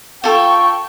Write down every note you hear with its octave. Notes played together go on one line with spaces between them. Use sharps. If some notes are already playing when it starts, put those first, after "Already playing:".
F4 A4 G5 C#6